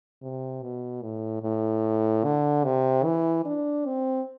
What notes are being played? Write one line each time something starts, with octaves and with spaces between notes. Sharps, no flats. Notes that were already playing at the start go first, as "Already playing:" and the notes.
C3
B2
A2
A2
D3
C3
E3
D4
C4